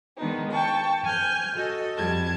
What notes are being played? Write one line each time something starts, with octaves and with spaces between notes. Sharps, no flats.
D#3 G#3 B3 D4 D#4
G5 A5 C#6
G#5 F6 G6
F#4 A4 D#5
F2 G3 A5 G#6